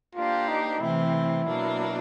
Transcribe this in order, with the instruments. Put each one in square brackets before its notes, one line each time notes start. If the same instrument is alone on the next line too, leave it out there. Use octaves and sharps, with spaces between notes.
[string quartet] A#3 D4 G4 C5 [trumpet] F4
[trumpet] D#4
[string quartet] C3 E3 A3 C4 [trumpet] E4
[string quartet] B2 F#3 A#3 D4